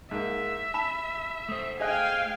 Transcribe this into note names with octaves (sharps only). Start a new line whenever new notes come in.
G#2 A#3 E5
A5 B5 E7
A3 C5 D#6
G#4 D#5 F5 G5 G#5 F#6